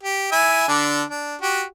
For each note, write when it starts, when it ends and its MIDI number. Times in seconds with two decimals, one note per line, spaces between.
0.03 0.30 67
0.32 0.67 64
0.32 0.67 76
0.32 0.67 80
0.68 1.03 50
0.68 1.03 62
1.11 1.36 62
1.41 1.63 66
1.41 1.63 67